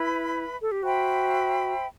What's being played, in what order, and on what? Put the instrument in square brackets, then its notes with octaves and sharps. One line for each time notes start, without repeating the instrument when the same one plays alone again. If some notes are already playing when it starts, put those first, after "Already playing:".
Already playing: [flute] E4 [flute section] B4 E5 B5
[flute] A4
G4
[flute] F#4 [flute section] C5 E5 G5 B5